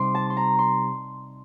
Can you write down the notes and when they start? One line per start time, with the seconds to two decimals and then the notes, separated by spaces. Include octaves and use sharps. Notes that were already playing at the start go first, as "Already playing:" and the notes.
Already playing: C3 G3 D#4 C6 D6
0.15 A5
0.30 C6
0.37 A#5
0.59 C6